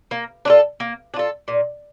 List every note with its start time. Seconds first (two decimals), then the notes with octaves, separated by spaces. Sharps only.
0.11 A#3
0.45 D4 F4 A4
0.80 A#3
1.14 D4
1.16 F4 A4
1.48 A#2